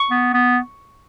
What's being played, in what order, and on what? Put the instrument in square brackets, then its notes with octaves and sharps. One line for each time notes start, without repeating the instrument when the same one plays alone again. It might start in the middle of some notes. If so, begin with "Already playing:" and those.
Already playing: [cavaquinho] C#6
[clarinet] B3
B3